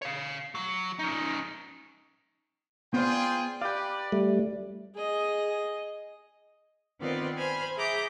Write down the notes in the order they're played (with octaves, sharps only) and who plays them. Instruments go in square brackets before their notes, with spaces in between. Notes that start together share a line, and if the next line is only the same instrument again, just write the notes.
[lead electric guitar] C#5 F5
F#3
C#4 D#4
[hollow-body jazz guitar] B3 C5 D5 [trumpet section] F4 G#4 G5
[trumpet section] G4 B4 D5 [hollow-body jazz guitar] F5 G5
[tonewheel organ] G3 A3
[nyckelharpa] G#4 D#5
[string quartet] D#3 B3 C4 F4 B4 D5
C5 G#5 B5 F6
G#4 E5 A#5 D6 G6